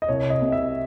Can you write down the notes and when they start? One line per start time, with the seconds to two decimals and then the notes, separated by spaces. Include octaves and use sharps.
0.02 D#5
0.08 C2 C#5
0.30 D#5
0.42 C3
0.52 E5